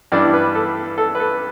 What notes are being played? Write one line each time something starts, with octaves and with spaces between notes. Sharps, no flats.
G2 E3 G3 D4 D5
B4
A4
A4
B4
A4